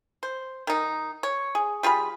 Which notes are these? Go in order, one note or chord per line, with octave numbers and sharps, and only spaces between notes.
C5
D#3 D#4
C#5
G#4
G3 F4 G#4 B5